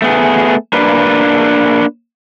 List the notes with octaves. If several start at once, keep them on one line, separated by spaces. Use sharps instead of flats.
A3 B3 G#4
A#3 D4 B4